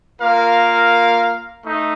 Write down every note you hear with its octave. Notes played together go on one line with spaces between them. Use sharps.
A#3 F4 A#4 F5
A3 D#4